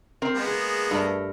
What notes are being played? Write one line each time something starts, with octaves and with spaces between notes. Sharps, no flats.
C4 A#4 C5
G#3 A#3 B3
G#4
G2 A3 A#4